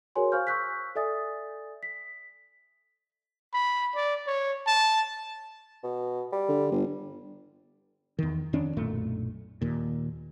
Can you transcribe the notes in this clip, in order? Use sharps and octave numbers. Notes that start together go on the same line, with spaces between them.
F#4 G#4 A#4 C#5 G#5 C6
C5 F5 G#5 C#6 F6 G6
C#6 E6 F#6 G6 B6
A4 D5 E5 G#5 D#6 A6
B6
B5
D5
C#5
A5
B2
G3
D3
G1
E2 D#3
F2 D#3 C#4 D4
B1 F#2 A#2 A3
D#2 A#2